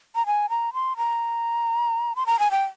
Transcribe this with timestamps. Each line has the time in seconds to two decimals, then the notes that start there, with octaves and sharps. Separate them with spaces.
0.15 A#5
0.26 G#5
0.50 A#5
0.74 C6
0.97 A#5
2.16 C6
2.26 A#5
2.40 G#5
2.51 G5